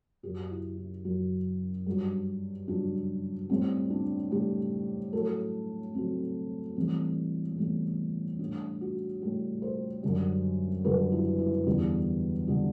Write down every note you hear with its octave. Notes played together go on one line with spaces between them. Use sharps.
F#2 F#3 G4
E4
E4
F#2 F#3
G2 F#3
G2 F#3 D4
A2 G3 C4
D4
A2 G3 G4
A2 F#3 A4
A2 F#3 C4
A2 E3 G3 C4
A3
A2 E3 G3 B3
A2 G3 D4
F#4
A2 G3
C5
F#2 D3 G3
F#2 D3 G3 B4
E4
E4
E2 D3 G3
D3 G3